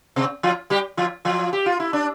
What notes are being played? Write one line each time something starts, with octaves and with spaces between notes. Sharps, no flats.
C3 C4
F3 F4
G3 G4
F3 F4
F3 F4
G4
F4
E4
D4